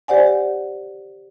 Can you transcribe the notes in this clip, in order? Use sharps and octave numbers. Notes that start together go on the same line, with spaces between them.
G4 C5 D5 F#5 G#5